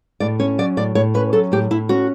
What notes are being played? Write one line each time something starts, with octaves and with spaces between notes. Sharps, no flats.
A2 D5
C#4 C#5
F#3 D5
A2 D5
A2 C#5
C#4 B4
F#3 A4
A2 G4
A2 E4
C#4 F#4